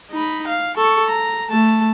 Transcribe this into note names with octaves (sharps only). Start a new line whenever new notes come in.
D#4 B5
F5
A4 C#6
A#5
A3 A5